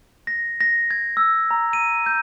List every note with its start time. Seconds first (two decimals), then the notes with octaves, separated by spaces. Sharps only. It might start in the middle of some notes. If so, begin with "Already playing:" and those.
0.27 A#6
0.61 A#6
0.91 G#6
1.17 E6
1.51 A#5
1.73 D#7
2.06 G6